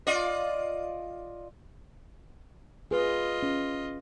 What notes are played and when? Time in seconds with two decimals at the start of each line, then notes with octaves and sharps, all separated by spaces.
0.07 F4 D5 D#5
2.91 F4 G#4 B4 D#5
3.43 C#4